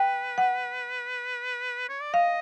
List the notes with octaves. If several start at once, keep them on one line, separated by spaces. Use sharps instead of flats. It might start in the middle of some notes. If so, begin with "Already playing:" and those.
Already playing: B4 G5
F#5
C#5
D5
D#5 F5